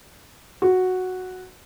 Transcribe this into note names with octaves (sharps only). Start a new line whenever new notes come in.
F#4